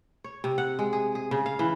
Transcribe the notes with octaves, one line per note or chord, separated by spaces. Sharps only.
C#5
C3
F#5
G#3
G#4
G#4
C#3
F5
E3